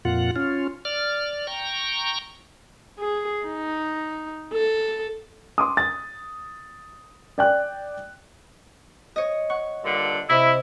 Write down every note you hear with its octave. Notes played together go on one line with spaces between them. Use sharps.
F2 A#2 F4 F#5
C#4 F4
D5 F6
G5 A#5 C#6
G#4
D#4
A4
C6 D6 D#6
A6
D5 G5 F#6
C#5 D#5
F#5 C#6
G2 A#2 D3
C3 E4 D#5